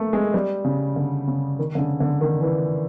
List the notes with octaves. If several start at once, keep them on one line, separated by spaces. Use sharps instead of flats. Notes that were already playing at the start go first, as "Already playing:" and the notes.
Already playing: A3 A#3
G#3
G3
C#3
D3
C#3
D#3
D3
C#3
D3
D#3
E3